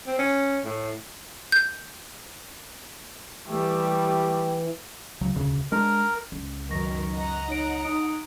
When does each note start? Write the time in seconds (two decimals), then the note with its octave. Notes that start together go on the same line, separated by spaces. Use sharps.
0.07 C4
0.19 C#4
0.65 A2
1.52 G6
3.47 E3 G3 A3 G4
5.21 C#2 C#3 F#3
5.35 E1 D2 C#3
5.72 G#3 D4 A#4
6.32 C#2
6.70 F#2 D#3 A#4 B4 C#6 A#6
7.15 D#5 F#5 A#5
7.48 D#4 C#5 D7
7.84 D#4 D#6 D7